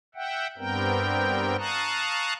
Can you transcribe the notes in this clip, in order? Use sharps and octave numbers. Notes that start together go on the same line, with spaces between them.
E5 F#5 G5
G2 G3 B3 C4 A#4 G5
F5 A5 A#5 C#6 D#6 F#6